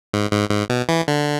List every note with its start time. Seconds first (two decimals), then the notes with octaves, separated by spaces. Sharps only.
0.14 G#2
0.32 G#2
0.51 G#2
0.70 B2
0.89 E3
1.08 D3